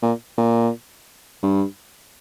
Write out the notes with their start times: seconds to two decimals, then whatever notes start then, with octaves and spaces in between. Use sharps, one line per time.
0.02 A#2
0.38 A#2
1.42 G2